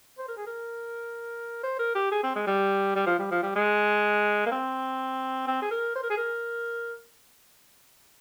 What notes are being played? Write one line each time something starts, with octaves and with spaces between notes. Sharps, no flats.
C5
A#4
G#4
A#4
C5
A#4
G4
G#4
C4
G#3
G3
G3
F3
G3
F3
G3
G#3
A#3
C4
C4
G#4
A#4
C5
A#4
G#4
A#4